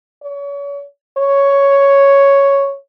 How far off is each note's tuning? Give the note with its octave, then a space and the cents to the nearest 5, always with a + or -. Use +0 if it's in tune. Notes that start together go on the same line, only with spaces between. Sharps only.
C#5 +35
C#5 +5